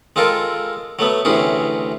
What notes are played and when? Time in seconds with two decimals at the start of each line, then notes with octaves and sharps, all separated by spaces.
0.16 G#3 C4 F4 A4 A#4
0.99 F#3 A3 B3
1.25 D2 C3 E3 C#4 G#4